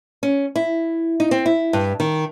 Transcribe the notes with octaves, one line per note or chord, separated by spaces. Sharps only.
C#4
E4
D#4
C4
E4
G2
D#3